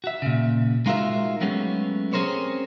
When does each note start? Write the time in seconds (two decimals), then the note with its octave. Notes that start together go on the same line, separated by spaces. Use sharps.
0.04 F#4 E5
0.22 A#2 C#3
0.86 G#3 D#4 F4 F#4 A#4 E5
1.41 F#3 G#3 A3 B3 C#4 G4
2.13 C4 C#4 G#4 A#4 C5 C#5